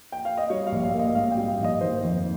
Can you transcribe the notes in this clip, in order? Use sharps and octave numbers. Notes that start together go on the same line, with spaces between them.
G5
F5
D#5
G3 C#5
F5
A#1
F5
A#3
D#5
G#2 F5
G5
G3
F5
A#1
D#5
D#3 C5
F2